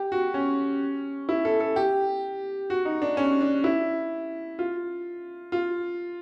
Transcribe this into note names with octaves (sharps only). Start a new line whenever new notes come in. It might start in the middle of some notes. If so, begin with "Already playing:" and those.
Already playing: G4
F#4
C#4
E4
A4
A4
G4
F#4
D#4
D4
C#4
D4
E4
F4
F4